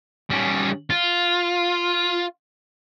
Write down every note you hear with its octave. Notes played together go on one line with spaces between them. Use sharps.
G3 C#4
F4